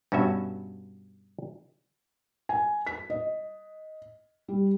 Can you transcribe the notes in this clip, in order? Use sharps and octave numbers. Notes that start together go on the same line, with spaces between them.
G2 B2 C#4 F#4 E5
G#5
B6
D#5
G3